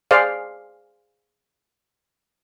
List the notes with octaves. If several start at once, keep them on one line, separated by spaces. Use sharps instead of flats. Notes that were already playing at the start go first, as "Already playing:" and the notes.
G#4 C5 D5 F5